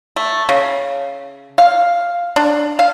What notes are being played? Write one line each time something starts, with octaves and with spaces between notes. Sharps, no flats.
A3
C#3
F5
D4
F5